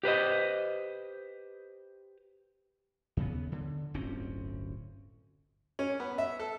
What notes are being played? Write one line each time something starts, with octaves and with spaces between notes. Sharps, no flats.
G4 B4 C5 D#5
D#2 C#3 B3
D3
D1 G1 C4 C#4
C#4
B3
E5
A4